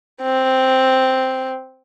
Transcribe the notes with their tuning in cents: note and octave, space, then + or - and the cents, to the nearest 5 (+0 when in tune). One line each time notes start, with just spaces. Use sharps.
C4 +0